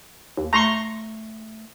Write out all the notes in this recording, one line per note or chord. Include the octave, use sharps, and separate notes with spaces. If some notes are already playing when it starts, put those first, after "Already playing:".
D#2
A3 A#5 C6 C#6